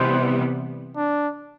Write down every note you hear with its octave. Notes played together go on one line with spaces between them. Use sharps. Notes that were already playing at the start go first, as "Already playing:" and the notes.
Already playing: C3 E3 G3 B3 C5
D4